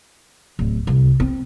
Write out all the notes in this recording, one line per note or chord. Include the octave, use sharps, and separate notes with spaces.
D1
C2
C4